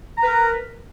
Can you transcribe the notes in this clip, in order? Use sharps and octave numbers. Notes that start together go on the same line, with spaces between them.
A#4 B4 A#5